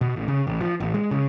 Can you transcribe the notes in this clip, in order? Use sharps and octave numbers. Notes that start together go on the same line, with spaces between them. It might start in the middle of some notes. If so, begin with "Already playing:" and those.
B2
A1
C#3
A1
F3
A1
G#3
C#3